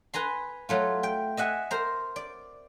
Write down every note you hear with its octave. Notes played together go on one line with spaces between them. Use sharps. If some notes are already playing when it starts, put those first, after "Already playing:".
B4 G#5 A#5 C6
F#3 A3 F4
G5
D#5 E5 F#5 G#5
A#4 C5 A#5
D5